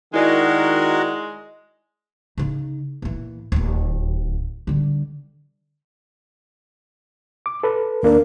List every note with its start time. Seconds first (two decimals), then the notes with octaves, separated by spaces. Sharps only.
0.14 D#3 G#3 E4 F#4 A#4 D5 D#5
2.38 C#3 D#4
3.02 A#2 E3
3.52 D1 D#2
4.67 D3 G3
7.46 D6
7.63 A4 B4
8.03 D#2 A#3 D4 A#4